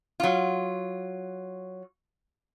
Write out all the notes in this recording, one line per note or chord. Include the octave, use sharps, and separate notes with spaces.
F#3 F4